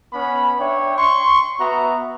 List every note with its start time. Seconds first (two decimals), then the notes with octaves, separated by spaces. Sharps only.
0.12 B3 C#4 B5
0.59 D4 C#5 E5 G5
0.97 C6 C#6
1.59 B3 F#4 E5 A#5